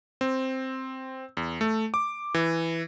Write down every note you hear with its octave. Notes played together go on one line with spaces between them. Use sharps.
C4
E2
A3
D6
E3